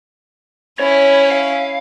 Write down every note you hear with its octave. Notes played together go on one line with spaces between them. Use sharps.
C#4 E4 C#5
F5